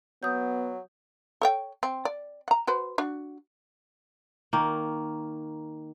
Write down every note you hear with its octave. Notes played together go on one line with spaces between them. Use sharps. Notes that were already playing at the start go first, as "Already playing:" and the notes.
F#3 B3 D#6 G6
A4 C#5 G5
C4
D5
F#5 A#5
F#4 B4 C5
D4 F#4
D#3 A#3